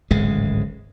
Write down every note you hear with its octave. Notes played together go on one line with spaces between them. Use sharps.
D1 G#1 C#3 G#3